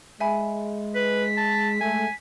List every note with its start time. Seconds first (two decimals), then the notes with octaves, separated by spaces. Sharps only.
0.20 G#3 E5 G#5 B5
0.95 B4 B6
1.37 A5
1.81 G#3 A3 G#5